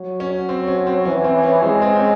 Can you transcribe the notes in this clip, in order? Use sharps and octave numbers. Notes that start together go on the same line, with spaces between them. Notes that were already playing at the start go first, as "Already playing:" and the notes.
Already playing: F#3
C#4
C4
C#4
C4
E3 C#4
C4
C#4
G#3 C4
C4
C4
C#4